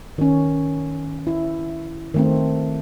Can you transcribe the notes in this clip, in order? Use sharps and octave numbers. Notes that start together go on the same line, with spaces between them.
D#3 C#4
E4
D#3 A3 C4